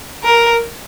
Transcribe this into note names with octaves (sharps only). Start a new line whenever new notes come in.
A#4